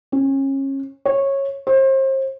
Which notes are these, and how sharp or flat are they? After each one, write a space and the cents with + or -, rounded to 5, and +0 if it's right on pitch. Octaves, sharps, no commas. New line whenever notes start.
C#4 -30
C#5 -15
C5 +35